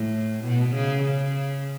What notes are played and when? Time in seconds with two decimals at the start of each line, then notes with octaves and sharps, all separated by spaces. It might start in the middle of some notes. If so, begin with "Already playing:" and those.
Already playing: A2
0.44 B2
0.74 C#3
1.03 C#3